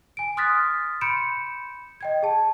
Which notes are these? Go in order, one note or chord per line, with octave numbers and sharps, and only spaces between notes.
G#5 D7
C6 D#6 F6 F#6 A6 B6
B5 C6 G6 C#7 D7 E7
D#5 G5 G#6
G#4 A5